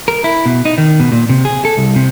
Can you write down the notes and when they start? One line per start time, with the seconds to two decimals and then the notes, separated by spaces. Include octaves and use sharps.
0.08 A#4
0.24 E4
0.46 B2
0.65 D#4
0.78 D#3
1.00 B2
1.12 A#2
1.29 C3
1.45 G#4
1.65 A4
1.77 C2
1.96 C3